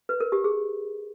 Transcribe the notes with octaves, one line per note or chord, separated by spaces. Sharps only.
B4
A#4
G4
G#4